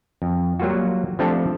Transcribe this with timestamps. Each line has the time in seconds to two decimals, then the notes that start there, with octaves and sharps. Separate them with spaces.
0.22 F2
0.60 F#3 G3 A#3 F4 F#4
1.19 F3 A3 C4 D4 G4 A4